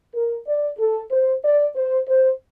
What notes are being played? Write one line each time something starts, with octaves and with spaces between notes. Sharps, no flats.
A#4
D5
A4
C5
D5
C5
C5